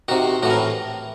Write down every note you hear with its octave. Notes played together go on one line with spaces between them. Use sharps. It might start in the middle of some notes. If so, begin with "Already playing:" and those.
C3 D#3 F#4
A2 E3 F#4
A#4